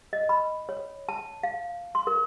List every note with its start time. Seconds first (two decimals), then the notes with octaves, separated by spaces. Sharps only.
0.13 D#5
0.29 B5
0.69 C#5
1.09 A5
1.43 F5
1.95 C6
2.07 A#4